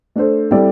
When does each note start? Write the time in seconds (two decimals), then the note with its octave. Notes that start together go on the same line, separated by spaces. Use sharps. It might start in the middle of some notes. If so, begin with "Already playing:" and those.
0.16 A3 D4 A4 C5
0.51 G3 C4 E4 A4 D5